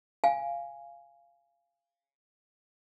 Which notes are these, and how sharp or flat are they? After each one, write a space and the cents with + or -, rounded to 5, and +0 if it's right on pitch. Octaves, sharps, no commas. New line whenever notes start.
F5 -15 G#5 +0